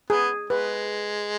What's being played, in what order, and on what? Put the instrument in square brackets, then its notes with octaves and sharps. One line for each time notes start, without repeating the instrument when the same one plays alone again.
[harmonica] B3 [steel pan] G#4
[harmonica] G#3 [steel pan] B4